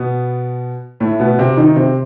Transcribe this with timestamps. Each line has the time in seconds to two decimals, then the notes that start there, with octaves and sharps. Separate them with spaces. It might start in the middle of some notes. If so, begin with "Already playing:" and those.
Already playing: B2 B3
1.00 A2 A3
1.20 B2 B3
1.39 C3 C4
1.57 D#3 D#4
1.76 C3 C4